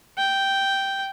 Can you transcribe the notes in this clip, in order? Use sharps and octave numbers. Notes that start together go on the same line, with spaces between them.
G5